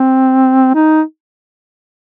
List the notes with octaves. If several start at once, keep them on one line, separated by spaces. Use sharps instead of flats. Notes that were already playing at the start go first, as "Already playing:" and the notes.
Already playing: C4
D#4